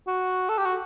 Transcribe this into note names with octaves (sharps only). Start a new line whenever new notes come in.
F#4
A4
G4
F#4